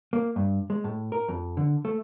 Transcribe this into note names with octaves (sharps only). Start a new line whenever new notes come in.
A#3
G2
G#3
A2
A#4
F2
D3
A3